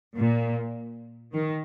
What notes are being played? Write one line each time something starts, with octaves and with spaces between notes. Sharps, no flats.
A#2
D#3